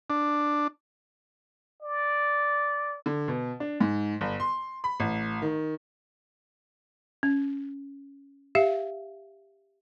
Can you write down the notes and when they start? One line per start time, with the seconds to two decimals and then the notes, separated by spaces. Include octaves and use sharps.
0.10 D4
1.82 D5
3.06 D3
3.28 B2
3.60 D4
3.81 G#2
4.21 G1
4.40 C6
4.84 B5
5.00 A1
5.42 D#3
7.23 C#4
8.55 G4 E5 F5